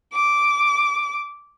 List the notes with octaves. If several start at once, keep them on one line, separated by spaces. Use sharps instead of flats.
D6